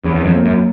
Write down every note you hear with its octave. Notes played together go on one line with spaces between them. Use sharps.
E2 C#4
E2
F2
A#3
F#2